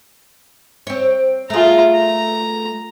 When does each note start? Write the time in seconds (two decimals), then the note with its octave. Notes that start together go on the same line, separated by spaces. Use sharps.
0.87 C4 C#5
1.50 A3 F4 G#4 A#5
1.95 A#5